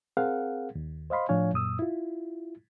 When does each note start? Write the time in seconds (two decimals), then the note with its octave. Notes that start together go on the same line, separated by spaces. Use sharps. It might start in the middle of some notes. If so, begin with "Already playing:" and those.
0.17 C4 G#4 A#4 F5 F#5
0.75 D#2
1.10 C5 D#5 F5 B5 C6
1.29 A2 F3 D4 C#5 F5 G#5
1.53 F#2 A#2 D#6 E6
1.79 E4 F4